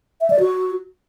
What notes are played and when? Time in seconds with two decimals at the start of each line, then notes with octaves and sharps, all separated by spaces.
0.21 E5
0.30 D5
0.40 F#4